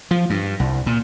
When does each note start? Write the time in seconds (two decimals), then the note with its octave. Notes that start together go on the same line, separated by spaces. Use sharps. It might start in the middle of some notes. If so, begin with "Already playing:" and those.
0.11 F3
0.30 G2
0.60 C2
0.86 A#2